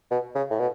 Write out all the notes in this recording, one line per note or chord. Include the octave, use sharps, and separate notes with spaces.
B2
C#3
A2
B2